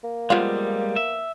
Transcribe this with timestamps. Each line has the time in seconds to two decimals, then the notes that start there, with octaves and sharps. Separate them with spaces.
0.04 A#3
0.30 F3 G3 G#3 B3 F4
0.96 E5